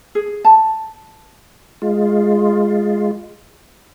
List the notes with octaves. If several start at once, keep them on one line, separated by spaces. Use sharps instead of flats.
G#4
A5
G#3 F4